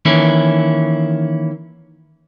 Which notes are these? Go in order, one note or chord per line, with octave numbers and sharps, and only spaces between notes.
D#3 E3 A#3 C#4 E4